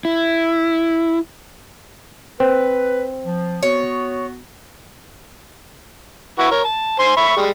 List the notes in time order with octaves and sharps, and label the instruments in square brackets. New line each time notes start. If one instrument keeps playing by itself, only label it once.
[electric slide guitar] E4
[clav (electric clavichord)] C4 [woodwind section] B4
[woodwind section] F3
[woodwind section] B3 F#4 [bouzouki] C#5
[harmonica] E4 F#4 B4
A#4 C#5
A5
C5 G#5 C6
E5 B5 C#6
G3 G#3